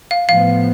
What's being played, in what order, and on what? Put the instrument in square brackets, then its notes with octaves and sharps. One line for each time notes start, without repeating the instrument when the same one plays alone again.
[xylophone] F5
[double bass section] A2 F3 B3 [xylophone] F5